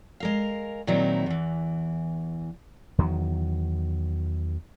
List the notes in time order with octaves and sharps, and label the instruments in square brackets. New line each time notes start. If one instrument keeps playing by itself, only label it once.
[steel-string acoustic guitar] G#3 A#4 F5
A#2 D#3 F#3 C4 D#4 E4
E2 E3
[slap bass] E2 D#3 F#3